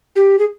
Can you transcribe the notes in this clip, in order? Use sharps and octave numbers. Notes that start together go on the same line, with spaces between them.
G4
G#4